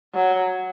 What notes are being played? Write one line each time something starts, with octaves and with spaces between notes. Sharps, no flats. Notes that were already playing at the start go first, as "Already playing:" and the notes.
F#3